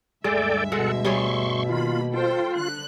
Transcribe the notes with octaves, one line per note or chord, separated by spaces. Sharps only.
D2 G2 G#3 A4 D5 E5 G5
B2 G#3 A4 F#5
G3 G#4 C#5 C6 C#6
D#3 A#3 F4 B5
F4 A4 C5 G5
D3 F#6